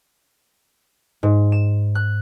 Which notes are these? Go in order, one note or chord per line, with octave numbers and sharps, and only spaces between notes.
G#2
E7
F#6